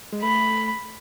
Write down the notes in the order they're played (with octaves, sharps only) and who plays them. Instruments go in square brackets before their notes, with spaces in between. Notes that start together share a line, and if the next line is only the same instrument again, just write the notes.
[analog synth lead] G#3
[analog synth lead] A3 [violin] B5